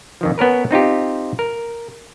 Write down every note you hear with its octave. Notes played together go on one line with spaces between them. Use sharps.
F2 D#3 F3
B3 C#4 A#4 B4
C4 D#4 F4 G4
A#4